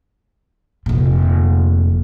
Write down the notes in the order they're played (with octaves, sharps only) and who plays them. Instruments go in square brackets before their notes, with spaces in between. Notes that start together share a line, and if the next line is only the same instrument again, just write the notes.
[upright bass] F1 A#2